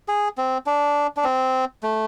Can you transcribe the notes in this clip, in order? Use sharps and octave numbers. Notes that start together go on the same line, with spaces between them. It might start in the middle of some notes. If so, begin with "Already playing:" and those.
G#4
C4
D4
D4
C4
A3